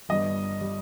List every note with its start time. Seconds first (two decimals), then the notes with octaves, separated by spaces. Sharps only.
0.09 G1 G2 G3 D#5
0.61 G3